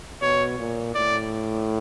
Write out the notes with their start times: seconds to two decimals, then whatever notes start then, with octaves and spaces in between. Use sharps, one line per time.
0.22 B2 C#5
0.58 A#2
0.95 A2 D5